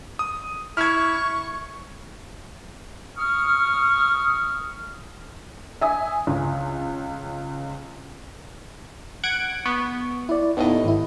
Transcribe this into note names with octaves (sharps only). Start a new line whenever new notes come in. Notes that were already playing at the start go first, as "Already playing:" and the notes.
D#6
E4 C#6 F6 G#6
C#6 D#6 F6
E5 G#5 D#6
C#2
F#5 G#6 D7
B3 C#6
E4 D5
D#2 A2 B3 D#4 D#5
G#1 E4